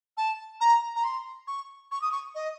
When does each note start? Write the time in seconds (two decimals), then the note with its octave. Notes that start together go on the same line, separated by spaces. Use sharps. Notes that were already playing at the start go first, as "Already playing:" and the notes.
0.17 A5
0.60 A#5
0.95 A#5
1.04 C6
1.47 C#6
1.91 C#6
2.01 D#6
2.12 C#6
2.34 D#5